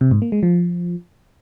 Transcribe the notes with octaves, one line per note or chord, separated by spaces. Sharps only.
C3
G#2
A#3
G#3
F3